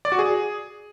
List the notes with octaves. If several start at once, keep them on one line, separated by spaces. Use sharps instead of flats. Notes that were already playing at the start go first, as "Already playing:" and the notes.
D5
F#4
G#4